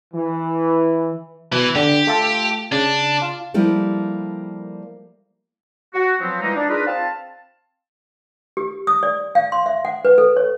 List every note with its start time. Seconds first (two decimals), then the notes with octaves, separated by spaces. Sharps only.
0.14 E3
1.52 B2 E3
1.76 D3 G4
2.07 A3 F4 A4
2.72 C#3 D4
3.22 F4
3.54 F3 G3 A#3 E4 G4 A4
5.93 F#4
6.20 F3 F#3 B3 C4
6.41 E3 F3 G3 G#3 A#3 D#4
6.55 D4
6.69 D4 D#4 F4 G#4 A#4 B4
6.86 C4 F5 A5
8.57 G4
8.87 D#6
9.03 D5
9.35 F5
9.52 C6
9.66 E5
9.85 F#5
10.05 B4
10.18 A4
10.37 C#5